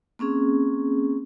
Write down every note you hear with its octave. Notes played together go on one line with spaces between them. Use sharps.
A#3 C4 C#4 G#4